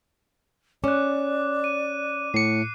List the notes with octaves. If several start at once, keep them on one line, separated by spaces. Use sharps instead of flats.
C#4 D5 D6 F#6
D#7
A2 C7 C#7